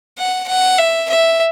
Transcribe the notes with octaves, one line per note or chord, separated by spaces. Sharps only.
F#5
F#5
E5
E5